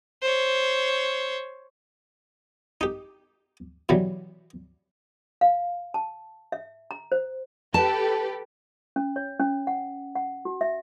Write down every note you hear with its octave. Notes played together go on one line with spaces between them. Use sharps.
C5 C#5
D#4 G4
B2 E3 F#3 G3
F5
A5
E5
A#5
C5
G4 A4 B4 A5
C#4
C#5
C#4
F#5
F#5
F#4
E5